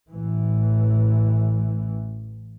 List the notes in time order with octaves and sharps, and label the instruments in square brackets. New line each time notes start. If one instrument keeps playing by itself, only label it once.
[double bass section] A1 E3